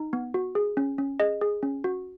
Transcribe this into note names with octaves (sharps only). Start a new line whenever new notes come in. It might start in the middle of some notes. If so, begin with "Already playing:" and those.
Already playing: D#4
B3
F#4
G#4
C#4
C#4
G#4 D#5
G#4
C#4
F#4